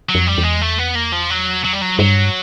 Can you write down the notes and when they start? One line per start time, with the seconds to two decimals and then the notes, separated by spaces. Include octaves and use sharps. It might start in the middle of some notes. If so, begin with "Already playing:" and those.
0.09 F#3
0.15 F2
0.27 G3
0.38 E2
0.43 G#3
0.61 A3
0.78 B3
0.95 A#3
1.12 F3
1.30 F#3
1.64 F#3
1.73 G3
1.81 F#3
1.99 G2 F#3